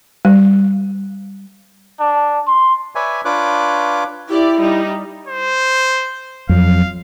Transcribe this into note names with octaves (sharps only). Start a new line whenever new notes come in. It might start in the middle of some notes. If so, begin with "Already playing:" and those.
G3
D4
C6
B4 C#5 D5 E5 G#5
D4 F4 B4 C#5 D6 F#6
E4 G4 D5
G3 D#4
C5
F2 F#3 F5